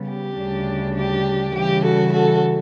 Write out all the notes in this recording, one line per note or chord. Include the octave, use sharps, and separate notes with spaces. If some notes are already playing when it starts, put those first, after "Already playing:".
Already playing: C#3 G3 B3
G4
D2 C#3 G3 D4
G4
C#3 E3 G3 G4
F#4 A4
F#4 A4